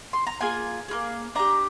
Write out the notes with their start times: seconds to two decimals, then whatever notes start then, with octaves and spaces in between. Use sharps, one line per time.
0.13 C6
0.27 A#5
0.41 A#3 F4 G#4 G#5
0.88 A#3 F4 G#4
1.35 D4 G4 A#5